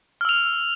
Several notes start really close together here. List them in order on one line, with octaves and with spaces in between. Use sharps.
F6 E6 F7